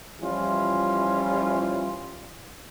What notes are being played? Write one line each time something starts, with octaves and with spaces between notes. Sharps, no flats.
E3 F3 G3 C#4 E4 F4